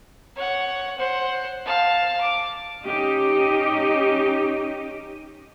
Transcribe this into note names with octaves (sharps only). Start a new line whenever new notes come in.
C#5 F#5
C5 F#5
F5 A5
D6
C#4 D#4 G4 D#5